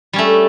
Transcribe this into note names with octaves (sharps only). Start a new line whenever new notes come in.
G3 A3 C#4